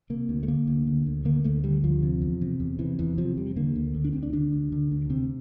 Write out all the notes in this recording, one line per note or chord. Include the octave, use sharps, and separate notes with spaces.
C3 A#3
D2
A3
D3 A#3
D2
D3
D2
D3 A#3
D2 A3
D3 G3
D2 F3
C3
E2
C3
E2
C3 E3
E2 E3
C3 F3
E2 G3
D3 A#3
D2
D3
D4
D2 C4
D4
D3 D4
D2
D3
D2
C3 C4